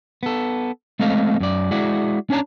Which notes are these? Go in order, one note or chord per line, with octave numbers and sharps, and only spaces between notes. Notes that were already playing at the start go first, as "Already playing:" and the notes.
B3 A4
G#3 A3 C4 A4 D#5 F5
F#2 D5
G#3 E4 F#4 D5
C#4 D4 C#5 A5 A#5